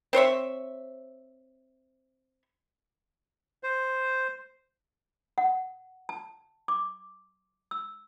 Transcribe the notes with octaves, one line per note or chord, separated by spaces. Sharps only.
C4 C5 C#5 E5
C5
F#5
A5
D6
E6